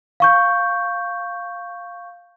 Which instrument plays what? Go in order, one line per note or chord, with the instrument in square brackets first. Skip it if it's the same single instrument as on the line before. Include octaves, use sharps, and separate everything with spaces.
[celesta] F5 C#6 G6